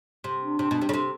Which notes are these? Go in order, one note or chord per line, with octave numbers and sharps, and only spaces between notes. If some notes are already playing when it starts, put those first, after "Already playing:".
C3
D4
C3
B2
C3
C#3
C3